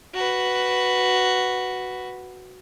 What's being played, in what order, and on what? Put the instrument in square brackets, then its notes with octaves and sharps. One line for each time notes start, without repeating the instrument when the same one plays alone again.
[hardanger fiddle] F#4 B4